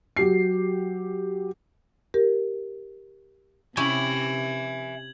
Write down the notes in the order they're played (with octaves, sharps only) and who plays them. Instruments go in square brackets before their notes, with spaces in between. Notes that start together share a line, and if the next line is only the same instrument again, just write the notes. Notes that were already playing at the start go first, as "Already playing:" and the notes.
[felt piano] F#3 G4 C7
[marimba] G4 A#4
[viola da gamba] C3 [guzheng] C#4 E4 G4 [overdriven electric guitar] E5 G#5 [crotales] G#6 F#7